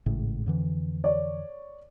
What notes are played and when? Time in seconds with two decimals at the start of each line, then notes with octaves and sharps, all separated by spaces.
0.06 G#1 A2 C#3
0.46 F2 D3 E3
1.04 C#5 D5